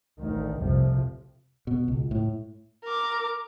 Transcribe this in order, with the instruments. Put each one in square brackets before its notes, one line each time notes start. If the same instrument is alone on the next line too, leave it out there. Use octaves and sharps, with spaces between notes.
[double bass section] A1 D2 D#3
F1 C2 C3 F3
[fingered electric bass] B2
C#2
A2
[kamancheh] A#4 D6